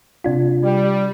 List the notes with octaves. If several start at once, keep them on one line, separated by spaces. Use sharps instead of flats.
C3 D4 F4
G3